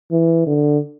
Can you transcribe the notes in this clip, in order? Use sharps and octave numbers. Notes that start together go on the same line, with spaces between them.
E3
D3